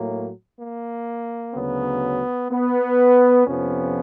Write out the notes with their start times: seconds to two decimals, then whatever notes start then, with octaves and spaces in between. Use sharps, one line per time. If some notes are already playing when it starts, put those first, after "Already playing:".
Already playing: A2 F#3 A#3
0.59 A#3
1.54 D2 C#3 F#3 B3
2.51 B3
3.47 F2 C3 F3 B3 C#4